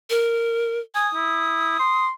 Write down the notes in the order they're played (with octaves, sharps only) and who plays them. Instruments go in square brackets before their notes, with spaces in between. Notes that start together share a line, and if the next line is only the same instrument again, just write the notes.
[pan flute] A#4
[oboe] G#5 [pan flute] D#6
[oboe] E4
C6